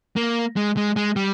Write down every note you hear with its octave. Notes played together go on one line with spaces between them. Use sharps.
A#3
G#3
G#3
G#3
G3